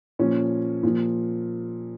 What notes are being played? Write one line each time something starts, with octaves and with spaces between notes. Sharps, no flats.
A#2 F3 C#4
A#2 F3